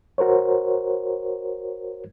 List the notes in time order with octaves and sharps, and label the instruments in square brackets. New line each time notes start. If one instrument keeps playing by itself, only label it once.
[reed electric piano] F#4 A#4 C5 C#5